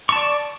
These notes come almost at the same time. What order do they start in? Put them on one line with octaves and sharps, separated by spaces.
C#6 A5 D5